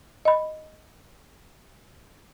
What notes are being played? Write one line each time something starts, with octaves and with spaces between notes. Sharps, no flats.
D#5 B5